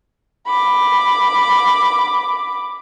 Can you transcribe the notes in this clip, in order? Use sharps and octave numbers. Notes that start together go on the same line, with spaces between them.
B5 D6